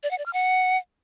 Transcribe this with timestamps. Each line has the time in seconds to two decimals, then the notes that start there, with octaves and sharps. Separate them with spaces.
0.03 D5
0.11 F#5
0.18 D5
0.26 F6
0.33 F#5